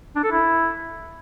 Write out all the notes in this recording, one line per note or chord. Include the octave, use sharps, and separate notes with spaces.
D4
A4
E4